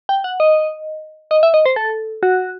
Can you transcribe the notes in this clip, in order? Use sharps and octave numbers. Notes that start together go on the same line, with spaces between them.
G5
F#5
D#5
D#5
E5
D#5
C5
A4
F#4